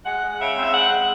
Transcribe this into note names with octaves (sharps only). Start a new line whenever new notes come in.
G#3 F#5
G#3
C#3 E5
C4
E5
G#3 F#5
G#3